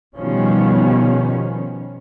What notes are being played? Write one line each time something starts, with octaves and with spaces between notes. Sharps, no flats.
B2 D#3 F3 G3 B3 C#4